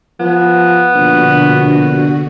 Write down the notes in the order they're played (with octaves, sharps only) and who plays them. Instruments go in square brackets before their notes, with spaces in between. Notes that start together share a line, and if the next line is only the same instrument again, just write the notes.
[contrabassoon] F3 [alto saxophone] B3
[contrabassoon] A#1 [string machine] B2 D3 F#4